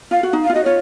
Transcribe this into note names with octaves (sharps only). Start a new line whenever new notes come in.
F4 F5
F#4
D#4
F5
F4
F#4 D#5
F4 C#5